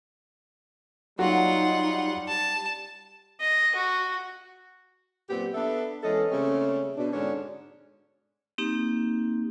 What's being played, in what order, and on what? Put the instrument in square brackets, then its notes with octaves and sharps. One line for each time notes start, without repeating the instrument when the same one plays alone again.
[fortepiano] F#3 F#4 [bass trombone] G3 [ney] D#4 [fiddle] F4 F#5
[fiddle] A5
D#5
F#4
[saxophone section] F#2 A#2 B3 C4 G4
B3 D4 A4 E5
E3 G#3 B3 C#4 A4 D#5
C#3 G3 A3 A#3 C4 C#4
B2 D4
G#2 D3 C#4 D4
[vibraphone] A#3 C4 D#4 G4